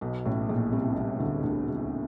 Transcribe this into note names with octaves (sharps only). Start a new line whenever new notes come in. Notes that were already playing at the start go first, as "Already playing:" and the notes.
B1 B2
A1 A2
A#1 A#2
C2 C3
C2 C3
D2 D3
D2 D3
C#2 C#3